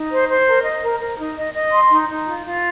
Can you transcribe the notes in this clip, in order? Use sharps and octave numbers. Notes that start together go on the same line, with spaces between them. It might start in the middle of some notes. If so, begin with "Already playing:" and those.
Already playing: D#4
C5
C5
A#4
D#5
A#4
A#4
D#4
D#5
D#5
C6
D#4
D#4
F4
F4